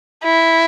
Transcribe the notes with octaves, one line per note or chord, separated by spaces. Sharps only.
E4